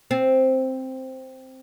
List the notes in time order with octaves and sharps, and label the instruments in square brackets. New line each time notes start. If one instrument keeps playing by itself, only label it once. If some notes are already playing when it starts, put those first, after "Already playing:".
[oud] C4